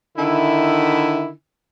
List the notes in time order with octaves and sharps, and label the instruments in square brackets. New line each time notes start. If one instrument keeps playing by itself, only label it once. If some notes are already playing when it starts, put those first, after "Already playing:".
[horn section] D3 D#3 E4